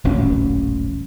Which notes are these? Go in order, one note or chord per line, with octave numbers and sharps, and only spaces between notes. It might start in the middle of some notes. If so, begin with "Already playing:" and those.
D#1 A1 F#2 C#4